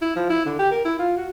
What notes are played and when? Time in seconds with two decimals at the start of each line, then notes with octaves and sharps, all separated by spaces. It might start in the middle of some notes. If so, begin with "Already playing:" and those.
0.02 E4
0.16 F3
0.30 E4
0.46 D3
0.59 G4
0.71 A#4
0.85 E4
0.99 F4
1.17 F#4